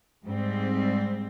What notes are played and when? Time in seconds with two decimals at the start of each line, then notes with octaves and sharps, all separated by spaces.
0.23 G#2 G3 C4